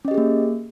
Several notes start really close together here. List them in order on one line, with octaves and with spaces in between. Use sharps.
C#4 D#5 G4 G#4 A#3